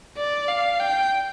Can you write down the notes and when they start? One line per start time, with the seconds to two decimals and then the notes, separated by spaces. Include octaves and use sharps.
0.17 D5
0.49 F5
0.80 G5